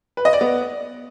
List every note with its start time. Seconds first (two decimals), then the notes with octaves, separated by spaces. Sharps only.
0.17 B4
0.25 D#5
0.33 D5
0.41 B3